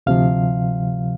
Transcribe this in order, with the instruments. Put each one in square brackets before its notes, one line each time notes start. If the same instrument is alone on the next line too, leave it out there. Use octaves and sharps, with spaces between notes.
[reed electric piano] D2 C3 F3 F5